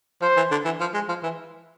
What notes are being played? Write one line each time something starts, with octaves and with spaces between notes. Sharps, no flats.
F3 C5
E3
D3
E3
F3
G#3
F3
E3